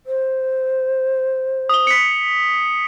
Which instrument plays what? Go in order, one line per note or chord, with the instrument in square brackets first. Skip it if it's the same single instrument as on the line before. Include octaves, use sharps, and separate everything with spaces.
[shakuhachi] C5
[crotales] D#6 G7
B6 C#7